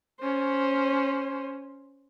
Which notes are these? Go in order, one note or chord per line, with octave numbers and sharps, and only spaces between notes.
C#4 C5